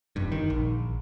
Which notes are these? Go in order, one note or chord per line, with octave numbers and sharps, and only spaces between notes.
F1 G2
D#3
A#1